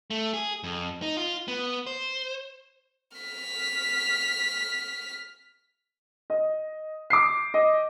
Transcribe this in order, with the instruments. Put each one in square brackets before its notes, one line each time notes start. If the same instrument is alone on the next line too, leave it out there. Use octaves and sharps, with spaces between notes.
[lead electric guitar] A3
G#4
F2
D#4
F4
B3
C5
[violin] F6 B6
[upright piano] D#5
D6 C7
D#5